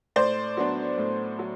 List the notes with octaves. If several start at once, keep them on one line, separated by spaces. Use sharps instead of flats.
A2 C5 D5
F#3 B3 D4
A2
F#3